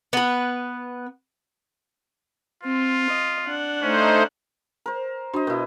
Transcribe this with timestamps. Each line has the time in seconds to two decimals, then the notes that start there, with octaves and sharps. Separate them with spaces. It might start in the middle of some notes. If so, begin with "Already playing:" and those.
0.13 B3 B4
2.63 C4 F4
3.10 D#5
3.47 D4 F#5
3.82 A3 C#4 D#4 C5
4.86 A#4 C5
5.34 D4 F#4 C5 D#5
5.47 B2 E4 F#4 A#4